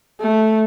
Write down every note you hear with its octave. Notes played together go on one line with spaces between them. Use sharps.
A3